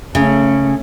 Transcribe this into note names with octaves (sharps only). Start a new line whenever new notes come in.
C#3 A3 C#4